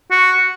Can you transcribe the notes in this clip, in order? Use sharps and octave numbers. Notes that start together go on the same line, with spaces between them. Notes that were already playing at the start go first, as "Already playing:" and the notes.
F#4